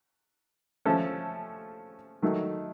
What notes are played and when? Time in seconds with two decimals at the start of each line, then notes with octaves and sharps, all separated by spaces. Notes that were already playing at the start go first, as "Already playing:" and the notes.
0.85 F3 A3 C#4 A4
2.22 D#3 F#3 A3 D#4